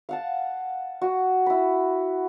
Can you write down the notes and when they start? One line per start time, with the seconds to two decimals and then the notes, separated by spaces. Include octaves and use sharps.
0.09 F5 F#5 A5
1.02 F#4
1.46 E4 B5